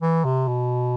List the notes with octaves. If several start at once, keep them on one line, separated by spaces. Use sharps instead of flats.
E3
C3
B2